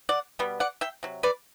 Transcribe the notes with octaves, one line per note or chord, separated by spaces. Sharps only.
D5 F#5
B2 G3 B3
D5 F#5
E5 G5
C3 F#3
B4 D5